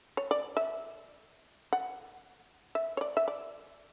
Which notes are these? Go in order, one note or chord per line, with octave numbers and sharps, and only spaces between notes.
C#5
D5
E5
F#5
E5
C#5
D5
E5
D5